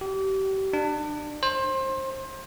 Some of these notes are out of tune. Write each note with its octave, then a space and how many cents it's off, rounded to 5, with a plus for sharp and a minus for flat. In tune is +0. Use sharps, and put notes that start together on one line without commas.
G4 -30
D4 +30
C5 +25